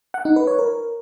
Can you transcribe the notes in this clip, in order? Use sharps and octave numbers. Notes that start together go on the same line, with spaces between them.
F#5
D#4
B4
C#5
A#4